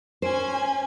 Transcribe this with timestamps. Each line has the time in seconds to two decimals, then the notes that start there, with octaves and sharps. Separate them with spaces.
0.22 C#4 C5 G#5